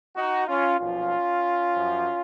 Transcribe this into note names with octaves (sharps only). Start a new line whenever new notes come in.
D#4 F#4
C#4 F4
B1 A#2 F3 C#4 F4
F#2 F3